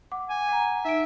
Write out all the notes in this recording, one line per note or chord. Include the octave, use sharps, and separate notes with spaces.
F#5 D6
G#5
F#5 A#5
D#4 E5 D7